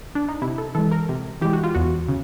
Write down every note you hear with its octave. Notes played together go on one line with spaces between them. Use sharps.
D4
D#4
C3 E4
A4
E3 G#3 A4
A#4
C3
E3 G#3 G4
F#4
F4
E2 F#4
C#3